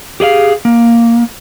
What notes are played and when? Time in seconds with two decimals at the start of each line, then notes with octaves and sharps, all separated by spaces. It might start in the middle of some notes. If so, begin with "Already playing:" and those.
0.20 G4 G#4 D#5 F5
0.65 A#3